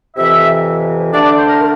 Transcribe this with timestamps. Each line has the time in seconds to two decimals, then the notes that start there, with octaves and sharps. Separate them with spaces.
0.16 F2 C3 E3 E5
1.12 D3 A3 D4 D5
1.25 D5
1.37 C5
1.49 A#4
1.60 A#4